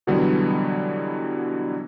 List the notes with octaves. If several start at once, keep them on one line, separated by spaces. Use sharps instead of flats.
B2 D3 E3 F#3 G3 B3